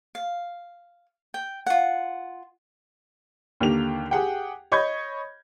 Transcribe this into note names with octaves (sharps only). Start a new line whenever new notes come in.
F5
G5
F4 F#5
D#2 D3 A#3 G4 F7
G4 G#4 F#5 G5
C#5 D#5 B5 C#6 G6 G#6